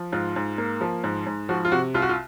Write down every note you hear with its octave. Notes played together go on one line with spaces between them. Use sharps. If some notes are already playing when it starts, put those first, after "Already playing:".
Already playing: F3
G#2 F4
G#2
A#3
F3
G#2
G#2
F3 F#4
F4
C3 F#4
C2 F4
F#4
F4